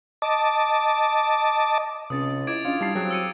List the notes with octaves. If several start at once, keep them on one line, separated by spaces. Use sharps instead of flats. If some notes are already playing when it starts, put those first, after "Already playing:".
D#5 A5 D6
C#2 C3 C#4 D#6 A6
E4 G#4 D#5 D6 G#6 D7
C#4 D4 F4
G3 E4 A5 C7
F#3 C4 G#4 C5 F#6
E6 C#7 D#7